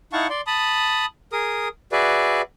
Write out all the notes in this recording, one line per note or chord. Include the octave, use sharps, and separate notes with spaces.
D#4 E4 F5 F#5 A5 C#6
D5 C6
A5 B5 D#6
G#4 A#4 D#6
F#4 G#4 B4 D5 E5